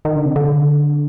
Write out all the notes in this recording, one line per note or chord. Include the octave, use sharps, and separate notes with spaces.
D#3
D3
C3
D3